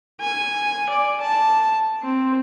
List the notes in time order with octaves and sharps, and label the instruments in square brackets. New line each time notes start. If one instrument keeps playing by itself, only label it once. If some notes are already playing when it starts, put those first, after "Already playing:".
[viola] G#5
D5
A5
C4